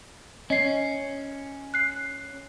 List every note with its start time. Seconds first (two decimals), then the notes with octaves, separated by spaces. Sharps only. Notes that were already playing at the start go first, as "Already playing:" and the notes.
0.50 C#4 D#5 C7
1.74 F#6 C7